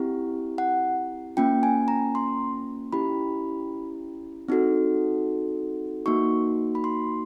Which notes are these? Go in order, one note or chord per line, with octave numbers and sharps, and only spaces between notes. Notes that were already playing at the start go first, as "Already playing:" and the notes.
Already playing: C4 E4 G4
F#5
A#3 C#4 F4 G5
G#5
A#5
C6
C#4 E4 G4 B5
C4 D#4 F#4 A4
A#3 D#4 F#4 C#6
B5
C6